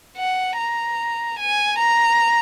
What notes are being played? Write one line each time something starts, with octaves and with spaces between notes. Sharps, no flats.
F#5
A#5
G#5
A#5